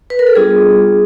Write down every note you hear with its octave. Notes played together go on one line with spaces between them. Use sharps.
B4
A#4
A4
G3 B3 D4 F4 G#4